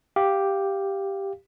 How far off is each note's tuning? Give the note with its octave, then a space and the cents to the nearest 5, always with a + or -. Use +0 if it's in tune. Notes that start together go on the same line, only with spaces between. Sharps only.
G4 +0 F5 -5